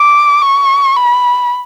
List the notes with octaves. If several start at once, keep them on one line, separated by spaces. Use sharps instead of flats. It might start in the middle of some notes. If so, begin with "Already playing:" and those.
Already playing: D6
C#6
B5